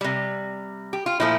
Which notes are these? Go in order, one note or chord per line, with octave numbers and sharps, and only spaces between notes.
C3 G3
G4
F4
A#2 F3 A3 E4